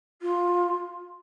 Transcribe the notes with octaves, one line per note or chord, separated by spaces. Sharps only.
F4